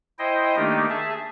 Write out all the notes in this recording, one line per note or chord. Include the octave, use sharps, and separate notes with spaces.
E4 C5 D#5 G5
D#3 A3 A#3 D4 D#4 G4
G#4 E5 A5